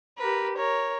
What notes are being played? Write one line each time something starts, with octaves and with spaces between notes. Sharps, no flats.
G4 A#4 B4
A#4 C#5